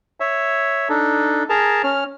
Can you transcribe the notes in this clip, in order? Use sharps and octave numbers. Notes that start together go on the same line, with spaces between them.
C#5 E5
D4 D#4 A4
G#4 A#4 A5 A#5
C#4 F6